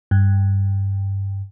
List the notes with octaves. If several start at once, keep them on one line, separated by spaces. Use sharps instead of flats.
G2